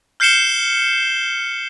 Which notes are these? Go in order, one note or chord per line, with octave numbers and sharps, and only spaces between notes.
F6 G6 C7 C#7 E7 G7